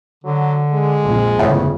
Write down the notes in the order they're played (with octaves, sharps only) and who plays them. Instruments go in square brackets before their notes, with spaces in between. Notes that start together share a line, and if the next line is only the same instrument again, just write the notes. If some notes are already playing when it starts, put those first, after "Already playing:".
[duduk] D3 [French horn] F#3
[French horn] G#3
[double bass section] A#1 F2 F3
[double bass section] G1 [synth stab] E2 A2 [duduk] C#3